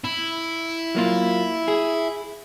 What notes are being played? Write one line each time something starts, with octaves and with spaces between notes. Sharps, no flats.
E4
F#3 A#3 F4
G#4